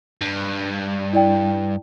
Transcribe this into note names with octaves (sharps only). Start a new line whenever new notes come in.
G2
E4 D5 G5